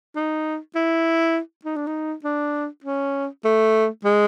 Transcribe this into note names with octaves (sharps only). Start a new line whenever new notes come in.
D#4
E4
D#4
D4
D#4
D4
C#4
A3
G#3